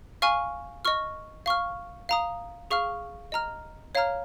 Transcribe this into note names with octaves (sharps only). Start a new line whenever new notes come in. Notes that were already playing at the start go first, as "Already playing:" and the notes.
F5 G#5 C#6 F6
D#5 C#6 F6
F5 C#6 F6
F5 A#5 D#6
G#4 F5 C#6 F6
D#5 A#5 F6
C#5 F5 A#5 F6